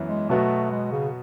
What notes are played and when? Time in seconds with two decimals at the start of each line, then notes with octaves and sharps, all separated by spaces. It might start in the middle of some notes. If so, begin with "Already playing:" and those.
Already playing: F#2 E3 B3
0.09 G#3
0.29 B2 F#3 A3 B3 F#4
0.71 G#3
0.92 C#3